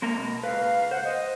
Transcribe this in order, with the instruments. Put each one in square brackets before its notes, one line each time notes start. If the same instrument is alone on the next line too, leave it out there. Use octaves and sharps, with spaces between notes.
[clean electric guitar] G#3 A#3 A#5
B2
[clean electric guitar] C#2 B4 [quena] F5
[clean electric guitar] C5 [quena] F#5
[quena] D#5